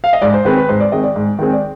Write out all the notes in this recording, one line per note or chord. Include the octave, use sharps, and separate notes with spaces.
F5
D#5
G#2 D5
C5
D#3 G#3 C4 B4
B4
G#2 C5
D5
D#3 G#3 C4 D#5
D5
G#2
D#3 G#3 C4
D5